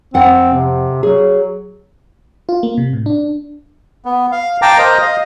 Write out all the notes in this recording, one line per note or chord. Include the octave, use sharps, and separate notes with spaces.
F2 C4 F#5 G5
C3
F#3 G#4
F4
A#3
C3
A2
D4
B3
F5
F5 G5 A5 A#5 D6
A#4 C5 D#5 A#5
D#5 F5